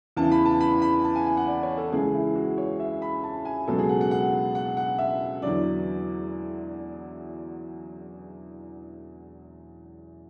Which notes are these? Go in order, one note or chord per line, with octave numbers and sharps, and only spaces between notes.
E2 C#3 E3 A5
B5
A5
B5
B5
A5
G#5
G#5
F#5
D5
C#5
A4
C#2 C#3 E3 G#4
E4
F#4
C#5
E5
B5
A5
G#5
C#2 B2 F#3 A4
G#4
F#5
F#5
F#5
F#5
F#5
E5
E2 D3 F#3 D5